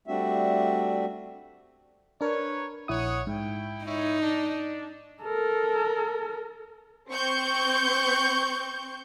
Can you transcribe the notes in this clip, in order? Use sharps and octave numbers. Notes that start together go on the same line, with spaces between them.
G3 A3 C4 D4 F#4 E5
D4 A#4 B4 C#5
A#1 E4 C#5 F#5 D#6
G#2 E4 G5
D#4 E4 C#5
D4
A4 A#4
C4 C#6 G6